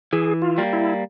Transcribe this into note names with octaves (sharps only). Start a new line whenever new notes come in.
E3 G#4
F4
G3 A#3
E4